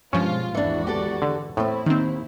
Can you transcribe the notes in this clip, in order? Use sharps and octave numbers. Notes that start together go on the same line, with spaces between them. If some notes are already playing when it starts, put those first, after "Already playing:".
G2 B2 F3 G#3 C#4 F4
G#1 E2 E3 D4 F#4
G4 A4 D5
D3
A2 A3 C4 E4
D#2 D#3 C4